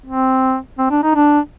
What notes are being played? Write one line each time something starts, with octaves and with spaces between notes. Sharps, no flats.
C4
C4
D4
D#4
D4